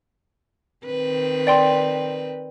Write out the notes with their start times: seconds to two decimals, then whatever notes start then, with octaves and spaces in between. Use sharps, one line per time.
0.85 D#3 C4 B4
1.47 D5 G5 C6